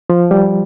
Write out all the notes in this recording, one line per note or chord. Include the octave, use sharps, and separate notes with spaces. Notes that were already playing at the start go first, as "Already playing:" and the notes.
F3
G3